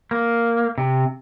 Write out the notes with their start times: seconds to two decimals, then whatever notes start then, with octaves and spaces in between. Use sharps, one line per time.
0.11 A#3
0.78 C3